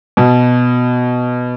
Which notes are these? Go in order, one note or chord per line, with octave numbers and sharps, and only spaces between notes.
B2